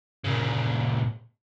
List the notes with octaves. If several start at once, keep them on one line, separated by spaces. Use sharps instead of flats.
A#2 C#3